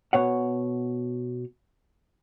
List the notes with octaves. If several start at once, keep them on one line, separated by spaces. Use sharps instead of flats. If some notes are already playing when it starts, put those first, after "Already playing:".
B2 C#5 F#5